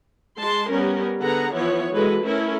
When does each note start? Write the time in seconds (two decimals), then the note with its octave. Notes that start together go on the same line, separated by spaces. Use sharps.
0.38 G#3 A5 C6
0.72 G3 B3 C#4 A#4
1.21 D3 B3 G#4 F#5 A#5
1.54 E3 F3 B3 E4 C#5
1.93 E3 G#3 F#4 A4 B4
2.22 A3 C#4 E4 A4 A#4